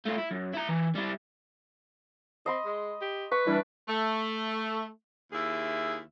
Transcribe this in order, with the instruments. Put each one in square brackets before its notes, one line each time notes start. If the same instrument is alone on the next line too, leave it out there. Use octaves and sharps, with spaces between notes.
[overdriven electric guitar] A3 F4
E4
F#2
E4 A#5
E3
G3 E4
[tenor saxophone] C4 [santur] D#5 B5 C6
[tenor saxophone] G#3
G4
[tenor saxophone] B4 [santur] C#6
[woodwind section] E3 G3 D4
[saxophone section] A3
D#2 E4 G#4 E5